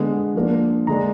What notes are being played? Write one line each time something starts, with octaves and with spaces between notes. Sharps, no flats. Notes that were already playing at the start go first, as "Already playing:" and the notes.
Already playing: D3 G#3 B3
F3 A#3 D4
D3 G#3 D4 A#5